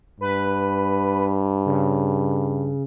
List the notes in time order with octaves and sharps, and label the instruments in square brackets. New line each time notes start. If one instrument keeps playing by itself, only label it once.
[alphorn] G2 [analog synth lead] B4
[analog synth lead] C#3